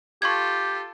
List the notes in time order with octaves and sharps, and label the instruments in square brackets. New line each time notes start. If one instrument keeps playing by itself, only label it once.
[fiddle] F4 A4 [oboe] G4 [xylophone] C#6 G#6